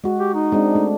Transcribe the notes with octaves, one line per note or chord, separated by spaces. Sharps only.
G#3 F#4
G4
D#4
G#3 C4 D4
A3 D4